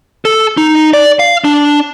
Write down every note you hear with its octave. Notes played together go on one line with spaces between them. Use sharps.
A4
D#4
D5
F5
D4